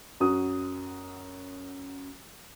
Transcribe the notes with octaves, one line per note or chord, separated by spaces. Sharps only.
F#2 F#4 D#6